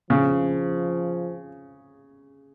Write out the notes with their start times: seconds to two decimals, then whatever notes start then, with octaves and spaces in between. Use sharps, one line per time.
0.10 C#3 F3